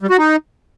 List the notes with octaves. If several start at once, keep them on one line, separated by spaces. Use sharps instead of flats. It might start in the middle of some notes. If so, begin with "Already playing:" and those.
G3
F#4
D#4